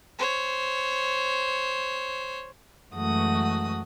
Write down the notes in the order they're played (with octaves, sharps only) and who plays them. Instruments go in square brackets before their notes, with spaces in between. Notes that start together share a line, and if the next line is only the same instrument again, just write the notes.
[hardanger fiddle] C5 C#5
[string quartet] F#2 E3 G#3 A3 F#4 D#6